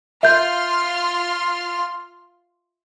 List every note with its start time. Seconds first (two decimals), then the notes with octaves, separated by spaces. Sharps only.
0.23 F4 E5 C6 F6 G6